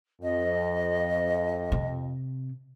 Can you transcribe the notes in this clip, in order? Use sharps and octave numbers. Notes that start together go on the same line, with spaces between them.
F2 D#5
C3